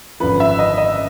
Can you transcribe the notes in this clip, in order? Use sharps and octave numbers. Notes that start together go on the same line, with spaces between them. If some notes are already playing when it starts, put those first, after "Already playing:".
G#1 F#2 D3 F3 B4
E5
D#5
D#5